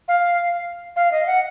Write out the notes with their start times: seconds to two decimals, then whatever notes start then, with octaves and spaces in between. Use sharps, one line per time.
0.08 F5
0.96 F5
1.12 D#5
1.27 F#5